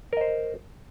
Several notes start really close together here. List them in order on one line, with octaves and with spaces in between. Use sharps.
A#4 D#5 C5